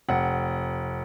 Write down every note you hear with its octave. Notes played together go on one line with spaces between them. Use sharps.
F1 F#5